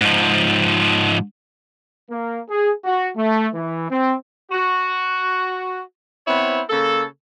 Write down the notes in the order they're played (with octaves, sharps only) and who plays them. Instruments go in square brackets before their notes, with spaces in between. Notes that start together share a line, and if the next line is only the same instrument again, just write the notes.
[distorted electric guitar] G#2 F3
[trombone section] A#3
G#4
F#4
A3
E3
C4
[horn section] F#4
B3 C4 E4 C5 C#5
C#3 A#3 A4